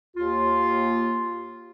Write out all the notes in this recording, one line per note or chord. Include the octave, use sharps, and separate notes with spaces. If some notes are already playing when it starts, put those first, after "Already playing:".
D#2 F4